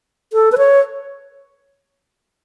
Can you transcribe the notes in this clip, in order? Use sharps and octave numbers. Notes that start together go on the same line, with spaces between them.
A4
B4
C#5